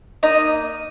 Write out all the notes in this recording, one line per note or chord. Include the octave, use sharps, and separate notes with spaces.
A#3 D#4 D#5